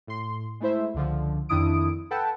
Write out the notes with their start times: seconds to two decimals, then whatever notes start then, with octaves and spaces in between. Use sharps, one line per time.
0.07 A2 C6
0.60 G#3 A3 E4 C5 E5
0.94 C#2 D3 F3
1.49 F2 D#3 D4 E4 D#6 D7
2.11 A4 B4 F#5 G5 A5